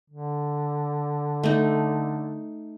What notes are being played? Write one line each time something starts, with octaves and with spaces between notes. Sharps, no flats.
D3
A3 D#4